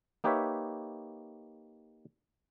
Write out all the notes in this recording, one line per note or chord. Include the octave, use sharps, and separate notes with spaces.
A#3 D#4 G4 B4 C#5 E5